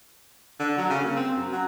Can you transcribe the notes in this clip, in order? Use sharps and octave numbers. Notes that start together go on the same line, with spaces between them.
D3
F#3
C#3
A#3
C4
F#2
F#3